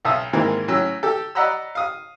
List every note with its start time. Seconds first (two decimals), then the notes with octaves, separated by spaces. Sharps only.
0.05 B1 E5 F5 A5 D#6
0.33 G#2 D#3 E3 G#3 A#3 C4
0.68 A2 F#3 C#4 E6
1.03 G4 A4
1.35 D5 D#5 F#5 A#5 B5 E6
1.75 F5 D#6